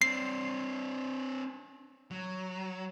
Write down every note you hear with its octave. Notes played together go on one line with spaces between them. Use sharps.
C4 D4 C7
F#3